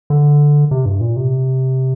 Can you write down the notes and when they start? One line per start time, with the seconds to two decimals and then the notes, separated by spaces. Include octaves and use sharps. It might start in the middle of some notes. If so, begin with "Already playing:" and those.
0.10 D3
0.71 C3
0.86 G2
1.01 A#2
1.16 C3